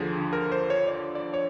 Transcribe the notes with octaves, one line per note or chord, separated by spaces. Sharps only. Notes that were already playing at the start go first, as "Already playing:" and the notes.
Already playing: D#2 D3 F3 G#4
A#4
C5
C#5
D5
D5
C#5